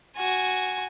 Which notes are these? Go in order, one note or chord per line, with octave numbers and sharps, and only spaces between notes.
F#4 G#5